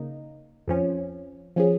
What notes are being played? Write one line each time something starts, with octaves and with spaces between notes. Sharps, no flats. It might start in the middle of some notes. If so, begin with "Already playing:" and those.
Already playing: C#3 A#3 D#4
F2 F3 C#4
F3 C#4 G#4